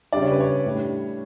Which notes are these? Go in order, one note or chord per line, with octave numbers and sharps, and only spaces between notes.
C#3 G3 D4 D5
C#5
B4
C#5
A2 G3 D4